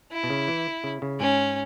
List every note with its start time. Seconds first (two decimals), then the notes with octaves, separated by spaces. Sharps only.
0.12 E4
0.24 B2
0.30 C#3
0.48 E3
0.84 C#3
1.02 C#3
1.20 G#2 C#4